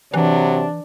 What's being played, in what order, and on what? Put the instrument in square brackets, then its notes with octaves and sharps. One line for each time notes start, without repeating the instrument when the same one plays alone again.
[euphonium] C3 [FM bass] E3 [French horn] F#3 [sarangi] D4